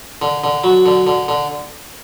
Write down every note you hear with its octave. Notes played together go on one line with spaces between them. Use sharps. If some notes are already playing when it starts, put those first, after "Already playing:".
D3
D3
F#3
D3
D3
D3